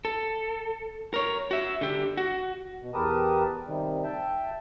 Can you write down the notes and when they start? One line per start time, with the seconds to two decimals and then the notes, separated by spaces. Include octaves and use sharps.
0.05 A4
1.14 A#4 C#5
1.51 F#4 E5
1.81 D3 G4
2.17 F#4
2.82 B2
2.94 E2 G4 A#4 B4 A5 D#6
3.67 C3 D#3 G3
4.04 E5 G5 A5